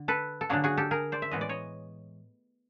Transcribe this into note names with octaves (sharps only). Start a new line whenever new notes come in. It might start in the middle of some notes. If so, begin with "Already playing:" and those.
Already playing: D3
A4 B4
A4
D3 F#3 A#3 D4 F#4 G#4
F#4 G#4
G4 A4
G#4 A#4
C5 D5
E5
A2 E3 G#3 B3 D#5
D5
C#5 D#5